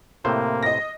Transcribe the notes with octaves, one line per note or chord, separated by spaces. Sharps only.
A2 C3 A#3 C5
D#5 A#6